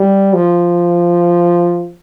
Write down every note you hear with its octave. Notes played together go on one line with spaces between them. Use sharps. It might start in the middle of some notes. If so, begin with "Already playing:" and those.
Already playing: G3
F3